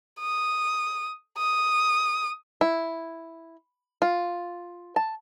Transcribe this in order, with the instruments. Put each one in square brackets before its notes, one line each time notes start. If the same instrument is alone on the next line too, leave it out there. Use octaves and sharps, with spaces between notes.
[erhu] D#6
D#6
[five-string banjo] E4
F4
A5